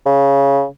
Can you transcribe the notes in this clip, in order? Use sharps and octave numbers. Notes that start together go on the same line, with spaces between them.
C#3